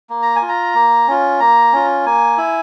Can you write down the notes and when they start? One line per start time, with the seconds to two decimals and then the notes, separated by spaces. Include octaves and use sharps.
0.10 A#3
0.22 A#5
0.36 G#5
0.42 F4
0.49 A#5
0.75 A#3
1.08 C#4 F4
1.40 A#3 A#5
1.73 C#4 F4
2.05 A#3 G#5
2.38 E4